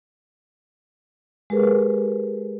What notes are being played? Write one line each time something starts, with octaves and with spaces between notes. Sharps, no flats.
G#3 G4 G#4 A#4 B4